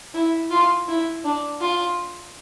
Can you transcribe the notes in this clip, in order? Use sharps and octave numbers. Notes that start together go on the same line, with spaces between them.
E4
F4
E4
D4
F4